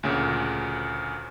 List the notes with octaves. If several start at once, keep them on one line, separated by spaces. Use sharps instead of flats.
D2 A#2 C#3